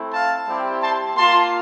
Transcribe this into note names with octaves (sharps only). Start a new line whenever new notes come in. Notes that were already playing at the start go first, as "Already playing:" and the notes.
Already playing: A3 C4 E4
F5 A5
G3 C4 E4 G4
A5 C6
A#3 F4 A5 C6